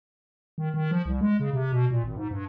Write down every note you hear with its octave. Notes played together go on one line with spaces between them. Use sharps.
D#3
D#3
F3
C2
G#3
C#3
C3
B2
A#2
G#1
G#2
G2